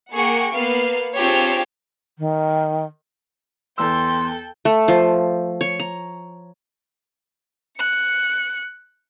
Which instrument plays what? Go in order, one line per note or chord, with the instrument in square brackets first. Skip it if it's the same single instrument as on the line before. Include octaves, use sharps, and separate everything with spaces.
[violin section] A#3 G#4 F#5 G5 C#6
A#3 B3 F5
C4 D4 F4 G4 G#4 C#5
[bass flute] D#3
[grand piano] E2 E6 [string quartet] A4 G5 [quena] C6
[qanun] A3
F3
C#5
A#5
[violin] F#6 C#7